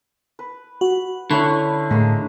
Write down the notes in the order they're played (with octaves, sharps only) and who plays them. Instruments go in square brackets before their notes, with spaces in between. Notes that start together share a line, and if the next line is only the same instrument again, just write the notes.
[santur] B4
[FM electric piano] F#4
[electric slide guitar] D3 [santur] A3 C#4 E4 [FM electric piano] B5
[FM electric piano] A2 [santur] G#3 A#3